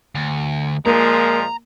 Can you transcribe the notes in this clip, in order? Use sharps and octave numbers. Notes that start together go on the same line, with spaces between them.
D2
A#2 F3 G#3 A#3 A#5